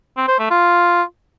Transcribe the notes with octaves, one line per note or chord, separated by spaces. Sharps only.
C4
C5
A3
F4